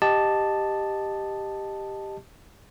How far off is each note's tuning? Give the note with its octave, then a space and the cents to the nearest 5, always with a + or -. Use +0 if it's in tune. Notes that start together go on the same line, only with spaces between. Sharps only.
G4 +5 D#5 -15 A5 +0